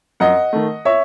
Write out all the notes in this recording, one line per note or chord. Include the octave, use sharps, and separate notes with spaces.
F#2 D#5 F#5
D#3 A3
C#5 E5